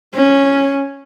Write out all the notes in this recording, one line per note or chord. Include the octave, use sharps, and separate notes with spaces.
C#4